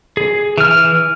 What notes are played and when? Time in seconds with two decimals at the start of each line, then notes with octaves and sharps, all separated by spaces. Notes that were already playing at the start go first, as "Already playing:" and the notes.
0.17 G#4
0.58 E3 F6